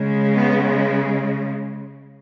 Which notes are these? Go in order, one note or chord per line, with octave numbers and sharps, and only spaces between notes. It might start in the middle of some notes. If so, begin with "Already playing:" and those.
Already playing: C#3 G#3
B3